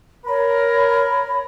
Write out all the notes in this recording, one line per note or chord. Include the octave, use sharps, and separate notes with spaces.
A#4 C#5 B5